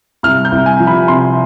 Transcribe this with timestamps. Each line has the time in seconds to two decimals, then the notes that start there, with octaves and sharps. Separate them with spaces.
0.23 C2 F6
0.45 G6
0.52 C2
0.66 G#5
0.80 F3
0.87 B5
1.08 C3 C6